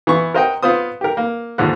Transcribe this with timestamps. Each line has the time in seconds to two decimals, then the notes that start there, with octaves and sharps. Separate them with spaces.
0.07 E3 B3 C#6
0.34 A#4 C5 D#5 F#5 G5
0.63 B3 F4 C5 D#6
1.01 G4 A#4
1.17 A#3
1.58 D#2 G#2 D3 F3 F#5